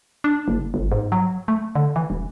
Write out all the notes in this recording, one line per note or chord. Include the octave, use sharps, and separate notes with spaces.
D4
F#1
G1
G#2
F#3
A3
D3
E3
E1